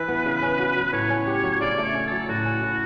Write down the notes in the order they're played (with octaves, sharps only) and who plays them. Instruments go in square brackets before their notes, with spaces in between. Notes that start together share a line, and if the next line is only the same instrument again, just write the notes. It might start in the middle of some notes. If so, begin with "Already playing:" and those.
Already playing: [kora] E3 E4 [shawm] B4
[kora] B3
C#3
C#4
F#4
F#3
[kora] A2 [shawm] C#5
[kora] C#4
G4
F#3
[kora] C#3 [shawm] D5
[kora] A3
[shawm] C#5
[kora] C#4
[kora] F#3 [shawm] A4
[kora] A2 [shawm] F#4
[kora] C#4
A2